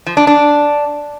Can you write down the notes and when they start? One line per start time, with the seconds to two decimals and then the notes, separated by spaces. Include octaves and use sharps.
0.06 F3
0.17 D4
0.27 D4